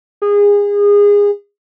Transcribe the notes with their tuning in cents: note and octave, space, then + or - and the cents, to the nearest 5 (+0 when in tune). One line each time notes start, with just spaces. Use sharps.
G#4 -25